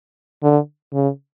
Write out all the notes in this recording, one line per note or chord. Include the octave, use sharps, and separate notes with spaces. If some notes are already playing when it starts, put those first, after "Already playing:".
D3
C#3